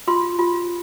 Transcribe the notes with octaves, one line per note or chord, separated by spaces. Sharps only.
F4 C6
F4